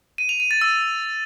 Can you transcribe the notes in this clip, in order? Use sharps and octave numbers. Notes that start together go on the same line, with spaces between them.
D#7
F7
D#7
A6
E6